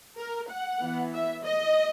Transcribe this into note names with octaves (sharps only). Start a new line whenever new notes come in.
A#4
F#5
E3 B3
E5
D#5